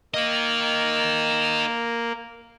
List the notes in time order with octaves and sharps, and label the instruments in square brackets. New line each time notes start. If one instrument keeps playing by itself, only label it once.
[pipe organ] A#3 [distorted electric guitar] A#4 D#5